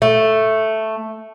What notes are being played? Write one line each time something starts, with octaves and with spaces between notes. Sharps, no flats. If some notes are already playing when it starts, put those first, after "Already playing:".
A3